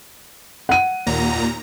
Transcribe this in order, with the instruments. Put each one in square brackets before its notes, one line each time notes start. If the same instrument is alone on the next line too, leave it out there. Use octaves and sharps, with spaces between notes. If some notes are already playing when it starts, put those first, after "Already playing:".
[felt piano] F#5 D#7
[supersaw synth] D#2 A#2 A#5